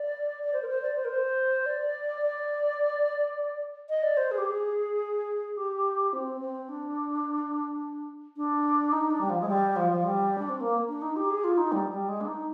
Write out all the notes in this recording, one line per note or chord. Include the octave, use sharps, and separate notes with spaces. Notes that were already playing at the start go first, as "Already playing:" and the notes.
Already playing: D5
D5
C5
A#4
C5
D5
C5
A#4
C5
D5
D5
D#5
D5
C5
G#4
G4
G#4
G4
C4
C4
D4
D4
D#4
D4
G3
F3
G#3
G3
F3
F3
G3
D4
C4
A#3
D4
D#4
G4
G#4
F4
D#4
G3
G3
G#3
D4
D#4